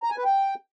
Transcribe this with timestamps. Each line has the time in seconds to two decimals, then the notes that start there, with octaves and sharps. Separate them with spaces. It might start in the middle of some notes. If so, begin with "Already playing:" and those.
0.03 A#5
0.10 G#5
0.17 B4
0.25 G5